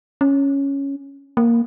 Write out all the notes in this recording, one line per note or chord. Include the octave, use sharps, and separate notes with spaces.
C#4
A#3